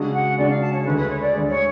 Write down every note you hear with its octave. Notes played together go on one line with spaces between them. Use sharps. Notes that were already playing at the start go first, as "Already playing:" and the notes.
Already playing: C#3 G#3 D4 F#4
F#5
C#3 G#3 D4 F#4 D5
F5
A5
C#5
D2 D3 G#3 B4
B4
C#5
D5
D2 D3 G#3
C#5